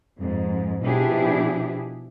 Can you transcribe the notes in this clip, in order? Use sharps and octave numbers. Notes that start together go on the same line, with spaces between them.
F2 G#2
B2 F3 D4 E4 G4 G#4